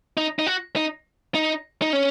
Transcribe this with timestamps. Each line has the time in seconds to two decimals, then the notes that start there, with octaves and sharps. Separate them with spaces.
0.17 D#4
0.39 D#4
0.46 F#4
0.76 D#4
1.35 D#4
1.82 D#4
1.93 C#4